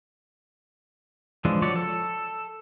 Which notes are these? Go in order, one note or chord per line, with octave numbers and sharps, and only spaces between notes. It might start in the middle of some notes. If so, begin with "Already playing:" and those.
E3 F3 G#3 D4
F3 F#3 C#5 D5
A4